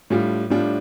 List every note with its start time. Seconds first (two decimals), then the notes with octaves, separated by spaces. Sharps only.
0.10 A2 G3 D4 F4
0.50 A2 G3 D4 F4